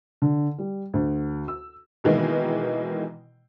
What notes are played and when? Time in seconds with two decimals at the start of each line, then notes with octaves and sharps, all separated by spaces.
0.22 D3
0.59 G3
0.94 D2
1.48 E6
2.04 B2 D#3 E3 G#3 A#3 B3